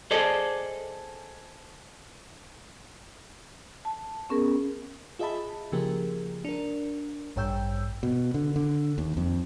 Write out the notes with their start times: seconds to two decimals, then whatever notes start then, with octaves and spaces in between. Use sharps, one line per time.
0.11 G#4 A4 C5 D5 D#5
3.85 A5
4.30 B3 C#4 G#4 A#4
5.19 F4 G#4 D#5 E5 A5 B5
5.72 C#3 F3 A#3 G4 G#4 A#4
6.45 D4 A#4
7.36 A1 G2 C#5 G5 E6 G6
8.03 B2
8.34 D3
8.56 D3
8.98 D#2
9.17 F2